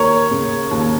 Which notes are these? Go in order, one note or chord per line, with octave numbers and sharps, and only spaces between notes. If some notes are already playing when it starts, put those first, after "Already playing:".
Already playing: D#2 A#4 C#5
C#3
D#2